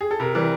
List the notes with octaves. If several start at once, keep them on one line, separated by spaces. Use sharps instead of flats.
G#4
A4
C3 A#4
E3 G3